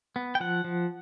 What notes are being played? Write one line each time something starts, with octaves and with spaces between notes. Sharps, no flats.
B3
G5
F3 F#5
F3